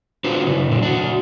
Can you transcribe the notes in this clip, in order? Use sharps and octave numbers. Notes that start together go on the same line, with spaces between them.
D4 F4 F#4 B4 C5
F#2 C#3 E4
A#2 D3 F#3
D4 F#4